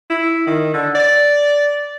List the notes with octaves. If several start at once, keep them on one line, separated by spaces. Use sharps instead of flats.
E4
D#3
D3
D5